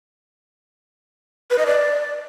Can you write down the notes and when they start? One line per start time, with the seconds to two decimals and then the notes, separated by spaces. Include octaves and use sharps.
1.51 B4
1.58 D#5
1.66 D5